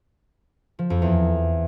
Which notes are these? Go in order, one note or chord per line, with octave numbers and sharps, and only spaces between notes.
F3
F2
E2